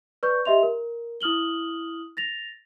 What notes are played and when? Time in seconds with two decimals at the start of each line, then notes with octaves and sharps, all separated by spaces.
0.23 B4 D5 C#6 G6
0.45 G4 D#5 E5 C6 F7
0.63 A#4
1.21 E4 D#6 F6 F#7 G7
2.17 A6 A#6 F7